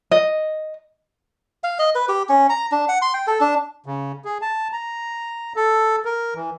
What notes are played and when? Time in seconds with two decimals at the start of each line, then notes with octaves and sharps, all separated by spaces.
0.11 D#5
1.64 F5
1.79 D#5
1.95 B4
2.09 G4
2.29 C#4
2.50 A#5
2.72 D4
2.89 F#5
3.02 C6
3.14 G5
3.27 A4
3.40 D4
3.86 C#3
4.25 G#4
4.42 A5
4.72 A#5
5.56 A4
6.05 A#4
6.35 E3